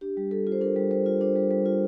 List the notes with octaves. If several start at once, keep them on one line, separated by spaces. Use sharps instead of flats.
D4 G4
G3
G3 A4
F4
C5
D4 A#4
G3
G3 C5
F4
D4 C5
G3
G3
F4